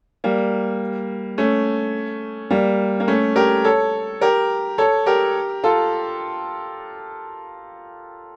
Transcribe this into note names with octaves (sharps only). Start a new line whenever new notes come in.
G3 A#3
A3 C#4
G3 A#3
A#3
A3 C#4
G4 A#4
A4 C#5
G4 A#4
A4 C#5
G4 A#4
F4 A4